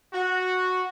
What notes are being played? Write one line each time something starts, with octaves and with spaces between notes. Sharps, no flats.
F#4